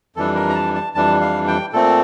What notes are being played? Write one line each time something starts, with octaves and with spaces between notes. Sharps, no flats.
F2 E3 G3 D4 A4
A#4
A#5
A5
A5
F2 E3 G3 D4 A5
F5
G5
A#2 A3 C4 A4